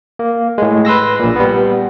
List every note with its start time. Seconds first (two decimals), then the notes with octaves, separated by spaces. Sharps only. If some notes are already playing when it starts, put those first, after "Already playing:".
0.19 A#3
0.58 A2 G#3
0.85 B4 C6 E6 A#6
1.20 A#1 A#2
1.36 G3 B3